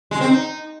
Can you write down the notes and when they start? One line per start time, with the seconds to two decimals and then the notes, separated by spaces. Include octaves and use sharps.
0.11 G#3
0.21 C4
0.30 D#4